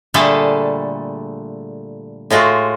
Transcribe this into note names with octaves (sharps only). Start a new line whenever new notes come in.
A#2 D3 G3 A3 G#4 A4
A2 G#3 F4 F#4